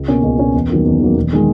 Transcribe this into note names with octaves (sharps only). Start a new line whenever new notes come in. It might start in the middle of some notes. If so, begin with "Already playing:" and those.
Already playing: C#2
B2 A#3 C#4
C#2
B2 A#3 C#4
E2
D#3 F#3 A#3
E2
D#3 F#3 A#3
E1
D#3 G#3